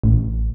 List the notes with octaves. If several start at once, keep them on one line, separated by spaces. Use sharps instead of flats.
A1